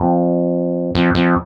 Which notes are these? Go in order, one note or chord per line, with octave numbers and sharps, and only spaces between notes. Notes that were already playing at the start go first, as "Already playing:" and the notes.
Already playing: F2
F2
F2